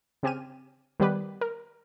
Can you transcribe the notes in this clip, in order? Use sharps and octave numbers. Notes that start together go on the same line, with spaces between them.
C#3 C4 G4 G#5 F6 D#7
D#3 G3 B3 G4 B4
A#4